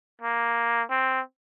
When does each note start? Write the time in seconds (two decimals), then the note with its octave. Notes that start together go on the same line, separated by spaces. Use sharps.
0.22 A#3
0.90 C4